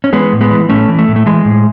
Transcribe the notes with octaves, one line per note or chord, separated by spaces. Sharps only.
C#4
E3 G#3 B3
A2
G#3 B3
E3
A2 A3 C#4
E3
A3
A2
A3
E3 G#3
A2